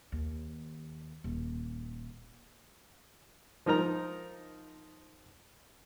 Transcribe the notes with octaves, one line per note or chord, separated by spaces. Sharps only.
D#2
D#1
F3 D#4 A#4 A#5